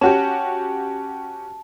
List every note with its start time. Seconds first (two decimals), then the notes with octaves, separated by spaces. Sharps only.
0.01 C#4 F#4 G4 A5